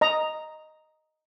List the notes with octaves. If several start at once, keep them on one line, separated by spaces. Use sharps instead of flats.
D#5 A#5